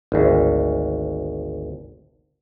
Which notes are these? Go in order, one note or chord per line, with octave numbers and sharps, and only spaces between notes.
G#1 D2